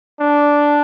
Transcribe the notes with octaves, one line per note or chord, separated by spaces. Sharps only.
D4